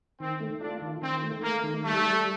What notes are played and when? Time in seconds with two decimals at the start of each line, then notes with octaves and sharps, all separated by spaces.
0.20 D#3 C4
0.40 A3
0.61 D4 F4
0.82 D#3
1.02 D#3 C4
1.23 A3
1.43 A3 A#3
1.63 D#3
1.84 G3 A3
2.05 G3